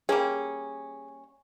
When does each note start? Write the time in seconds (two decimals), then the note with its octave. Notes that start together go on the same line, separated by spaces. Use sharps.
0.09 G3 A#3 C#4 G#4